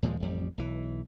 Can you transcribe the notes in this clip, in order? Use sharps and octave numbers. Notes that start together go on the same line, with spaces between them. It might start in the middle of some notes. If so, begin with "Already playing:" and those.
D#2 A#2 F3 G#3
A1 F2 G3
B1 E3